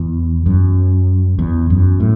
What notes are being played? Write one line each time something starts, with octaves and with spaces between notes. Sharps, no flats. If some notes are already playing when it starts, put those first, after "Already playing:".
Already playing: E2
F#2
E2
F#2
A2